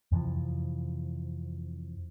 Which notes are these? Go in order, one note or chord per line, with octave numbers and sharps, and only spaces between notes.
F2 C3 E3 F3